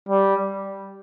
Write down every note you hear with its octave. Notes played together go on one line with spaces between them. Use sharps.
G3